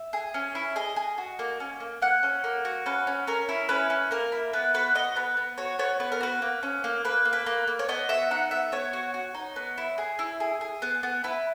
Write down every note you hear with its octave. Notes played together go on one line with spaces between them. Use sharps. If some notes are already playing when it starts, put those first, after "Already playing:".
Already playing: E5
G#4
C#4
E4
G#4 D#5
G#4
F#4
A#3
C#4
A#3
A#3 F#5
C#4
A#3
F#4
C#4 B4
C#4
C#4 A#4
E4
C#4 B4
C#4
A#3 A#4
E4
B3 B4
F#4 B4
B3 D#5
B3 B4
B3
F#4 C#5
B3 C#5
B3 B4
A#4
F#4 B4
A#3
C#4
A#3
A#3 B4
A#3
B4
A#3
A#3
C#5
B3 D#5
F#4 E5
D#4 F#5
B3 E5
B3 C#5
F#4
F#4
D#4
B3
E4
G#4
E4
G#4
G#4
B3
B3
E4 B4